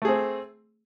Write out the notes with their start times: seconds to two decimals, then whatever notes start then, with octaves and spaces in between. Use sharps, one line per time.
0.02 A3
0.05 G#4
0.08 C4